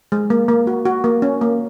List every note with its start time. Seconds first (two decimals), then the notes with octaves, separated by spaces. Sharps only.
0.12 G#3
0.30 A#3
0.48 A#3
0.67 F#4
0.86 F#4
1.04 A#3
1.22 C#4
1.41 A#3